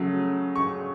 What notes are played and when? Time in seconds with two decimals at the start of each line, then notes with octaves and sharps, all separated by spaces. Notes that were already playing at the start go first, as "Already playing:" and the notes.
Already playing: C#3 F#3 A3
0.56 C#6